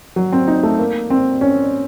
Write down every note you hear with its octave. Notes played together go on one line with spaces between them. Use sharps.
F#3
C4
D#4
A3
A#3
C4
C#4